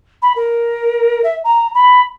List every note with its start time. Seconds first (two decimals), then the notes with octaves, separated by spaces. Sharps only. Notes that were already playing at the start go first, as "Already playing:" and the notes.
0.22 B5
0.36 A#4
1.24 E5
1.44 A#5
1.74 B5